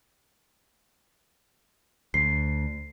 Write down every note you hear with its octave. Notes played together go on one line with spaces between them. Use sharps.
D2 C7